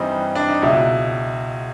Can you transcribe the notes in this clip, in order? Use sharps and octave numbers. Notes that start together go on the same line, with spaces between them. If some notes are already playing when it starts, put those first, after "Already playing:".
Already playing: G2 E3 G3 C4 D#4
D4
D#4
C#2 B2 F#3 E4